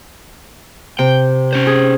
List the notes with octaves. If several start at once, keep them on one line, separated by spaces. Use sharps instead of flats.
C3 G5
C#4 C5
G#4